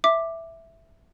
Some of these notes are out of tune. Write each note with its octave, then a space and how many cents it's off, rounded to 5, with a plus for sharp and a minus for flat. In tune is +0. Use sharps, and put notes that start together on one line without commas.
E5 +0 D6 +5